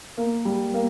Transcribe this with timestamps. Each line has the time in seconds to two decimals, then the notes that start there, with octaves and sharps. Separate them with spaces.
0.17 A#3
0.45 G3
0.74 A#3